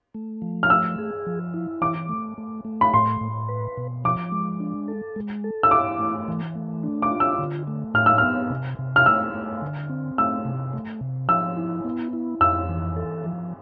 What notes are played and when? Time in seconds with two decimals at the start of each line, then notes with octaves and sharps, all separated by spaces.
0.14 A3
0.42 F3
0.63 F6
0.70 A3 E6
0.99 G#4
1.26 F3
1.54 E4
1.82 E3 D6
2.09 A3
2.38 A3
2.65 A3
2.81 B5
2.93 A2 C6
3.21 A2
3.49 B4
3.77 B2
4.04 F3 D6
4.32 G#3
4.60 D4
4.88 A4
5.16 G#3
5.44 A4
5.63 E6
5.71 E4 D6
5.99 A3
6.28 E3
6.55 A3
6.83 D4
7.02 D6
7.11 F4
7.20 E6
7.38 D3
7.67 A3
7.94 A2 F6
8.06 E6
8.18 B3 F6
8.50 C3
8.79 C3
8.96 F6
9.06 A3 E6
9.34 A3
9.62 D3
9.89 C4
10.18 A3 E6
10.45 C3
10.73 A3
11.01 C3
11.29 F3 E6
11.57 E4
11.84 B3
12.13 E4
12.40 F2 E6
12.69 E3
12.97 A4
13.24 F3